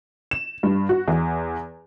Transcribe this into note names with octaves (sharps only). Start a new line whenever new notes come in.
E7
G2
F#4
E2